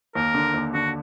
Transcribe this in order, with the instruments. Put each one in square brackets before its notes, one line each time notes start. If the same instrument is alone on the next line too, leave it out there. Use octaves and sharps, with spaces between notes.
[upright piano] D#2 [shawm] A#4
[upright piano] D3
D#2
[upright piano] D3 [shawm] F#4